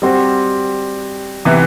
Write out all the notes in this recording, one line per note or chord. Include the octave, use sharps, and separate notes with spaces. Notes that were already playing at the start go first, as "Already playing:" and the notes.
G3 C4 F#4
C3 E3 B3 E4